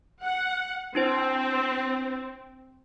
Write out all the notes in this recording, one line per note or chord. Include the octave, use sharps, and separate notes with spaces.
F#5
C4 D4 E4 C5